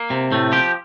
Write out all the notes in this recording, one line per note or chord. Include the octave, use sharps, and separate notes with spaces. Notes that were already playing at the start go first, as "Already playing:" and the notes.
Already playing: A#3
C3
A2 A3
F3 G4